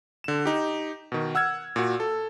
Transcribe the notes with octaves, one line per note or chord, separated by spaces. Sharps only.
D3 E7
D#4 G4
B2 D#3
F#5 E6 F6 G#6
A#2 F#4
A4